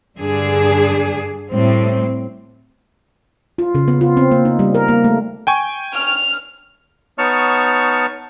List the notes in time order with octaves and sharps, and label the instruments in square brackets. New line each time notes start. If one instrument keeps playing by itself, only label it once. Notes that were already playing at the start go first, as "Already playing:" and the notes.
[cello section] G2 D3 D4 G#4
A2 G3 C4
[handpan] F4
C#3
B3
F4
C4
A#3
D#4
G3
A#4
A#3
A3
[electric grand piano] G5 G#5 C#6
[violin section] F6
[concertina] B3 D#4 C#5 A5 C#6 F6